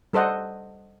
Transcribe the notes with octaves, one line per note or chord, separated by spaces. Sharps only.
G3 A4 C5 D#5 F#5